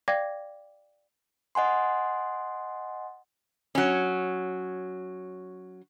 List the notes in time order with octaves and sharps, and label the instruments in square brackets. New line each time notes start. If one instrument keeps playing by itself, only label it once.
[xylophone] D5 F5 G5 D6 G#6 A#6
[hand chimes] D#5 F#5 G#5 C6
[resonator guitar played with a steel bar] F#3 C#4